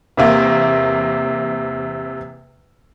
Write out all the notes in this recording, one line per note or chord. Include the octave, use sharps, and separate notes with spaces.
E2 C3 A#3